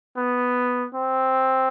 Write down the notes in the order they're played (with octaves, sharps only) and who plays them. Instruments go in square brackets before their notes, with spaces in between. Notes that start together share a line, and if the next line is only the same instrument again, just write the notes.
[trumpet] B3
C4